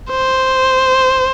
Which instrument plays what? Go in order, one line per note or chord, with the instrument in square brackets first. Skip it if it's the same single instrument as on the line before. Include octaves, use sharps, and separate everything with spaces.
[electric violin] C5